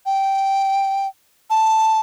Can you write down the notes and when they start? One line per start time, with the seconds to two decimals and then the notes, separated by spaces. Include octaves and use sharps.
0.06 G5
1.50 A5